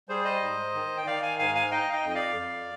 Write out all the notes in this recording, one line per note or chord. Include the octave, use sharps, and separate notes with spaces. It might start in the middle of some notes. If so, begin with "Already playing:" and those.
G3 G#4 C5
C5 D#5
G#2
D#3
G5
D#3 D5 F5
F5 G#5
G#2 F5 G#5
F5 G#5
D#4 D#5 G5
F5
D#5 G5
F2
D#5
D5 F5
F2